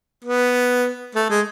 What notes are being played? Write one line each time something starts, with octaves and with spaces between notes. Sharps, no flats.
B3
A3
G#3